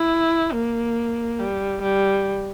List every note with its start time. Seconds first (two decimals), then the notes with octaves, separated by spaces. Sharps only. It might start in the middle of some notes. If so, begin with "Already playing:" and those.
Already playing: E4
0.53 A#3
1.40 G3
1.82 G3